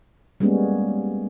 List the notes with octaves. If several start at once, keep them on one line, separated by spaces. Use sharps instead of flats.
G3 G#3 A#3 B3 C#4